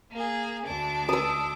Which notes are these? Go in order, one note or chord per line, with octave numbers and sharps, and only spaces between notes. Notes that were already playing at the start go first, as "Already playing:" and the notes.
A#3 G#4
D2 D4 D6
D#6 E6